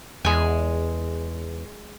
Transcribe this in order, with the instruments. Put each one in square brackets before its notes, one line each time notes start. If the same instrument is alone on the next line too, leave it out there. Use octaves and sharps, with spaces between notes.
[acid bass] E2 [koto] G#3 G#5